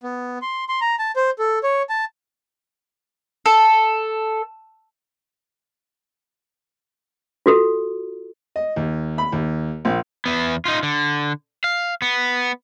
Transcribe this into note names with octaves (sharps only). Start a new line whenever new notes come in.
B3
C6
C6
A#5
A5
C5
A4
C#5
A5
A4
F4 F#4 A4
D#5
D#2
B5
D#2
A#1
E2 B3
D#4 F4
D3
F5
B3